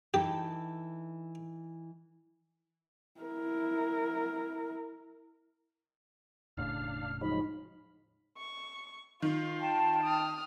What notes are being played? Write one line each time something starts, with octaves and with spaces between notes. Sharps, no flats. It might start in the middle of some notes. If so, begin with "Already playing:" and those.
E3 D#4 G4 A4
E4 A#4
E1 A2 C#3 D4 F5 F6
F3 F#3 G#3 D#4 B5
C#6
D#3 F4
G5 A5
D#6 F6